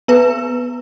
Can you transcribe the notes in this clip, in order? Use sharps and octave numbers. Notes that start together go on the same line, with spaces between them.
B3 B4